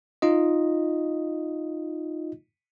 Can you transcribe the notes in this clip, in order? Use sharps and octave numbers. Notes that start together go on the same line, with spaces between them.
D#4 F4 D#5